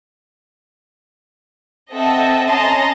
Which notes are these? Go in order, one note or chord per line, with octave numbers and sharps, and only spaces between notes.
C4 A4 D#5 E5 F#5 A5
C#4 D#5 A5 A#5 C6